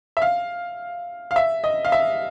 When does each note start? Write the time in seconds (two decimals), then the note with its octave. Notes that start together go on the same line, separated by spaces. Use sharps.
0.17 E5
0.22 F5
1.31 F5
1.36 E5
1.64 D#5
1.85 F5
1.92 E5